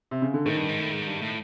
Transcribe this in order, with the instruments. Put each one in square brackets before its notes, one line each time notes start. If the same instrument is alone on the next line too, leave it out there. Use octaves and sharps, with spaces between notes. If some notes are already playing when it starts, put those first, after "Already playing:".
[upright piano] C3
C#3
D3
[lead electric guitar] A2 [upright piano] D#3
[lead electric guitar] G2
G#2
A2
G#2
G2
A2